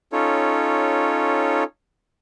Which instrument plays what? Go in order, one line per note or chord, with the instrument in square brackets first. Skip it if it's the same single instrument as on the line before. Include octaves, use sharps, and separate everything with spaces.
[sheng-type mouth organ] C#4 D#4 F4 A4 C#5